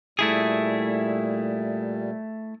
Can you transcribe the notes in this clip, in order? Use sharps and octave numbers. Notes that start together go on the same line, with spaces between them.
A#2 G3 A3 E4 G#4